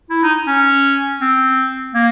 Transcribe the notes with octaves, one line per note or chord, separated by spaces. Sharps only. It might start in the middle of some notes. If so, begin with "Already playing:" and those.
E4
D#4
C#4
C4
A#3